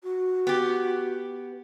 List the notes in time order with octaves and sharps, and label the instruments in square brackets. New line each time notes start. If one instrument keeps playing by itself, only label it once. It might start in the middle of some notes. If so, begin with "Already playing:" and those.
[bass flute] F#4
[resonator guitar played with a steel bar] B3 G4